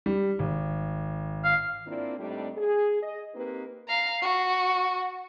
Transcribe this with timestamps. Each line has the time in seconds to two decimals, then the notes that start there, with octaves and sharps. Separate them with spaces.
0.06 G3
0.39 G#1
1.45 F5
1.87 A#3 C4 D4 E4 F4 D5
2.18 A2 G3 A3 C4 D4 D#4
2.57 G#4
3.03 D#5
3.34 A#3 C4 D#4 G4 B4
3.87 F5 A#5
4.22 F#4